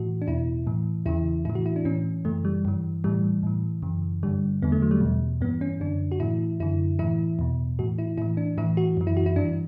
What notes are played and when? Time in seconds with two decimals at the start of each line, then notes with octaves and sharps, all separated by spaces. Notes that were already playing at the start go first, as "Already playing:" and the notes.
Already playing: A2 E3 F#4
0.22 D4
0.27 E2 B2 E4
0.66 A2 E3
1.06 E2 C#3 E3 E4
1.45 A2 E3 E4
1.55 F#4
1.66 E4
1.76 D4
1.85 A2 E3 C#4
2.24 F#2 C#3 E3 A3
2.45 G3
2.65 G2 E3
3.04 A2 E3 G3
3.43 A2 E3
3.82 F#2 C#3 E3
4.23 G2 D3 G3
4.62 E2 D3 B3
4.72 A3
4.82 F#3
4.91 G3
5.01 E2 B2
5.41 G2 B3
5.45 E3
5.61 C#4
5.80 F#2 D3 D4
6.12 F#4
6.20 A2 E3 E4
6.60 F#2 D3 E4
6.99 A2 E3 E4
7.39 E2 B2
7.79 A2 E3 F#4
7.98 E4
8.18 A2 E3 E4
8.37 D4
8.58 A2 E3 E4
8.77 F#4
8.97 F#2 E3
9.07 E4
9.17 F#4
9.26 E4
9.36 G2 E3 D4